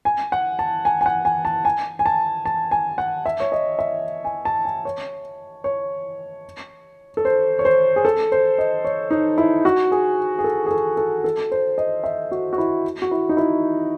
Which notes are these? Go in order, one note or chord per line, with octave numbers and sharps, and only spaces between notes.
G#5
F#5
A5
G#5
G#5
F#5
G#5
A5
G#5
G#5
A5
A5
G#5
F#5
E5
C#5
D#5
E5
G#5
A5
G#5
C#5
C#5
A4
C5
C#5
C5
G#4
A4
C5
D#5
C#5
D#4
E4
F#4
G#4
G#4
A4
G#4
A4
A4
A4
C5
D#5
E5
F#4
F#4
E4
F#4
E4
D#4
E4